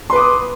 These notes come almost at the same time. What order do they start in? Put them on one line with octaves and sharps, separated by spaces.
C6 B4 D6 D#6